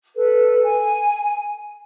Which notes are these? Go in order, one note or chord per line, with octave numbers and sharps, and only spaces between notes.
A4 B4
G#5